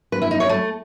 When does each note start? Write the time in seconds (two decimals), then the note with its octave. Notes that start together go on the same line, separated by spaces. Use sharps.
0.12 B4
0.22 E4
0.31 D#4
0.40 C#5
0.49 A3